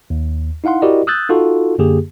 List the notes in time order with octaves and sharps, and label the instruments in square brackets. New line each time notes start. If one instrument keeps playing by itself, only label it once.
[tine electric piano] D#2
D#4 E4 F5 F#5 C6
E4 F#4 G4 A#4 D5 D#5
D#6 E6 F#6 G6 A6
D#4 F4 F#4 A4
F#2 D3 A#3 G4 G#4